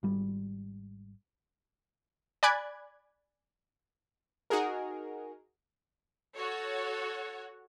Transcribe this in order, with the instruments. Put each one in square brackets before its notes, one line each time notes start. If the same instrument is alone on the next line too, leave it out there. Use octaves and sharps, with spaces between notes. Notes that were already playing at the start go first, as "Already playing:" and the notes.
[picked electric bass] G#1 G3
[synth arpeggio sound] D5 G#5 B5 D6 F#6 G#6
[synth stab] D#4 F#4 G#4 A#4
[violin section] F#4 C#5 [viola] A4